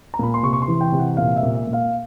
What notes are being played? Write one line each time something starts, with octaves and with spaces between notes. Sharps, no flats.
A#5
A#2 B5
C6
C3 C#6
C#6
C6
E3
G5
C3
F#5
A#2 F5
E5
A#2
E5
A#2
F5